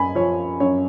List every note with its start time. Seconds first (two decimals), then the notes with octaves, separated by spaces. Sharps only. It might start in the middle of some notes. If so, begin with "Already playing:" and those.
Already playing: F#2 G#5 B5
0.15 F3 C#5
0.60 F#2 C#5